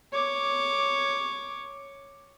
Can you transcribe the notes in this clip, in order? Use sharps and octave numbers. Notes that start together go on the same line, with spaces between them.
C#5 D6